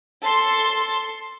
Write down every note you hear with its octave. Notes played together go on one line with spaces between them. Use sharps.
A4 C6